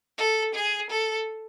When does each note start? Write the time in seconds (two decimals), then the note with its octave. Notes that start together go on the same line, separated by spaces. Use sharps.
0.18 A4
0.54 G#4
0.90 A4